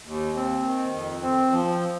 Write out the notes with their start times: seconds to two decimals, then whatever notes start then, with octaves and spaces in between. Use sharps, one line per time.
0.06 D#2
0.35 C4
0.64 D#3
0.93 F2
1.22 C4
1.51 F3